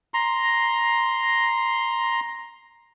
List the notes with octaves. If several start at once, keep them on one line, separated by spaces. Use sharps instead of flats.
A#5 C6